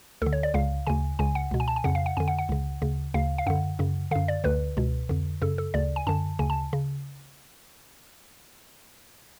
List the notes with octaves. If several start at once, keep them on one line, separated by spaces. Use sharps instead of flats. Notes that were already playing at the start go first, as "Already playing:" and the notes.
D2 D3 A4
C#5
D5
C#2 C#3 F5
D2 C#3 G#5
C#2 C#3 G#5
F#5
C#2 B2
G#5
A5
G#5
F2 C#3 F#5
F5
F#5
F2 D3 G#5
F#5
F#5
C#2 C#3
D2 C#3
D2 C#3 F5
F5
F#2 D3 F#5
F#2 C#3
F#2 D3 F5
D5
D2 D3 B4
C#2 B2
F2 D3
F#2 C#3 A4
A4
D2 C#3 D5
G#5
F#2 D3 A5
D2 C#3 G#5
A5
C#3